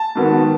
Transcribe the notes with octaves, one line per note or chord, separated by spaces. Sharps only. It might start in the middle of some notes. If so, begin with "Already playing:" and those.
Already playing: A5
G#2 D#3 F#3 B3